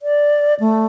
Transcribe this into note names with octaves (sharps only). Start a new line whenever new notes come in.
D5
A3